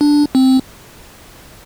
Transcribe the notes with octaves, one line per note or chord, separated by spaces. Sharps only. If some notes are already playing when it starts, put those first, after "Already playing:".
D4
C4